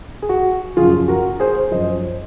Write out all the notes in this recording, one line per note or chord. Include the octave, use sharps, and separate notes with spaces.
G#4
F#4
F#2 C#3 F3 F4 G#4
F#4 A#4
G#4 C5
F#2 F3 C5 D#5